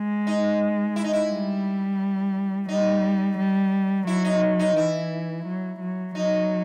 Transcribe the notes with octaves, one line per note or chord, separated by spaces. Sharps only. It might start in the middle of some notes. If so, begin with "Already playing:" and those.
Already playing: G#3
D#4
E4
D#4
E4
G3
G3 D#4
G3
F#3 E4
D#4
D#4
E3 E4
F#3
F#3
F#3 D#4